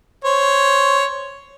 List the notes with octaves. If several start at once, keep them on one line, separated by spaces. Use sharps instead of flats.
C5 C#5